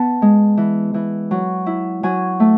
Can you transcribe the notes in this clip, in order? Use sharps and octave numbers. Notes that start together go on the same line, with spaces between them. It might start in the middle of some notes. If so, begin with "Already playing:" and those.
Already playing: B3 A5
G#3
E3
E3
F#3
E4
F#3 G#5
A3